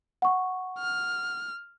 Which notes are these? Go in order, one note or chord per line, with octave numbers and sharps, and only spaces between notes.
F#5 C#6
F6